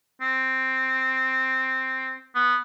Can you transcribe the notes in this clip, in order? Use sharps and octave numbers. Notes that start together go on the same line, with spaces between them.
C4
B3